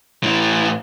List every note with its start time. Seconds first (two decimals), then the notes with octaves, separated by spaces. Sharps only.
0.23 A2 E3